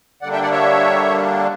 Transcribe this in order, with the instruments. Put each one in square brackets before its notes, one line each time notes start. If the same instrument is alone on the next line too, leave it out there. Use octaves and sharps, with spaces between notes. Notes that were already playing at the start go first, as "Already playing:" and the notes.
[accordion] D3 G3 A#3 D4 D5 F#5
E5 G5
D5 F#5
C#5 E5